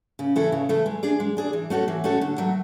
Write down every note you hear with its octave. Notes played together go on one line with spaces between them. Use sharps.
C#3
E3 A3 E4 A4
C#3
E3 A3 E4 A4
G#3
D4 G#4 D5
G#3
D4 G#4 D5
E3
A3 C#4 F#4 A4
E3
A3 C#4 F#4 A4
D3
F#3 A3